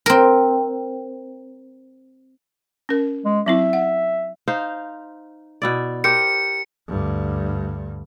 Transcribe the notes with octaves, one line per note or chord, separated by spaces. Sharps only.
C4 A#4
C#4 A#4
G#3
F#3 C4 E4 E5
F#5
D#4 C5 F5
B2 E4 D5
G4 A#4 C5 C#7
D2 G2